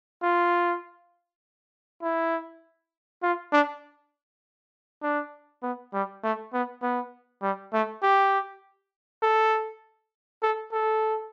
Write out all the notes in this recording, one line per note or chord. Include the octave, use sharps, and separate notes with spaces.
F4
E4
F4
D4
D4
B3
G3
A3
B3
B3
G3
A3
G4
A4
A4
A4